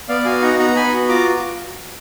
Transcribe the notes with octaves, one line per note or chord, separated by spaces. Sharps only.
B3 D5 F5
F#4 F5 G#5
D#4 F#5 A#5
B3 F#5 A#5
B3 G#5 B5
F#4
F4 A#5 D6